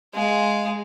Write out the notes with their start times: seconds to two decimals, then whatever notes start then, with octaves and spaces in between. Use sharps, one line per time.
0.14 G#3 F5